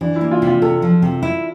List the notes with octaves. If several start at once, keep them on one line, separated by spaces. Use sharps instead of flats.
E3 D4
E4
A#3
F4
C3
F4
C3 A4
F3
C3
E4